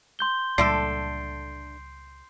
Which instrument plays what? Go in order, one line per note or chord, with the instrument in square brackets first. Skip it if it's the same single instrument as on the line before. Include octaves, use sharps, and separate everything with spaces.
[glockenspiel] C6 G6 G7
[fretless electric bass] C#2 A#2 G3 [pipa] D3 A3 A4 [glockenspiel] C7 D7